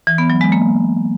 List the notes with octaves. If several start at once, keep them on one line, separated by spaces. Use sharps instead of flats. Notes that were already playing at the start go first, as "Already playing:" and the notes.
E3
B3
F#3
G#3
A#3